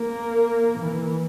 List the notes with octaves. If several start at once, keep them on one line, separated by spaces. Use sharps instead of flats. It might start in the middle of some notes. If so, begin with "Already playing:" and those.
Already playing: A#3
E3